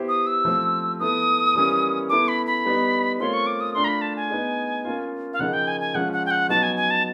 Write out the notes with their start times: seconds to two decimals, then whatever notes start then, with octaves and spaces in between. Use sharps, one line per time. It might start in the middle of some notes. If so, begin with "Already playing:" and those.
Already playing: B3 E4 G4 C5
0.08 D#6
0.27 E6
0.45 F3 A3 C4
1.00 B3 E4 A4 D#6
1.55 E3 G3 A#3 C#4
2.09 B3 E4 A4 D6
2.28 B5
2.46 B5
2.65 G3 B3 D#4
3.20 A3 C4 F4 A#4 C#5 C6
3.33 C#6
3.47 D6
3.61 D#6
3.74 A3 D4 F4 C6
3.84 A#5
3.88 B5
4.01 A5
4.16 G#5
4.30 B3 D#4 G#4
4.85 A#3 C#4 F4
5.33 F5
5.39 C#3 F3 A#3 D#4 G#4 F#5
5.53 G5
5.67 G#5
5.81 G#5
5.95 F3 G#3 C#4 F4 F#5
6.13 F#5
6.26 G5
6.31 F#5
6.49 F#3 B3 D#4 F#4 A5
6.63 G#5
6.77 G#5
6.90 A5